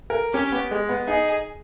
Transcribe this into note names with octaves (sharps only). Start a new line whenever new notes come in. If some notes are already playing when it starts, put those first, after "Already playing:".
A#4
C#4 G4
B3
G#3
B3
D#4 G#4